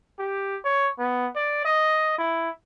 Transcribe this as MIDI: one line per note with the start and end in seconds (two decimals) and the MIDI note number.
0.19 0.57 67
0.64 0.89 73
0.99 1.27 59
1.36 1.63 74
1.65 2.16 75
2.18 2.49 64